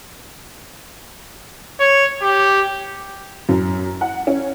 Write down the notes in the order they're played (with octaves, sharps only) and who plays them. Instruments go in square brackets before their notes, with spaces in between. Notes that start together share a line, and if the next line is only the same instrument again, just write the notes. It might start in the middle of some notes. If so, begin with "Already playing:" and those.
[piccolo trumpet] C#5
G4
[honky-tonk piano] F#2
F#5
C#4